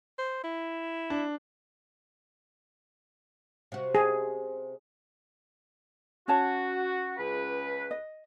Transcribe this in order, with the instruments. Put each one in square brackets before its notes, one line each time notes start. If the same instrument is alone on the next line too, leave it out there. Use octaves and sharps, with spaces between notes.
[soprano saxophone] C5
E4
[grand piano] D4
[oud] C3 F#4
[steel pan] G#4
[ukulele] C#4 C#5 A5 [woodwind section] F#4
[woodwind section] C#2 B4
[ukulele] D#5